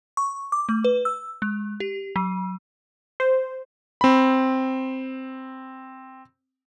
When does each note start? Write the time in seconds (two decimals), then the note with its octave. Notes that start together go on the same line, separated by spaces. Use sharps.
0.17 C#6
0.52 D6
0.69 A3
0.84 B4
1.05 E6
1.42 G#3
1.80 G4
2.16 F#3
3.20 C5
4.01 C4 B5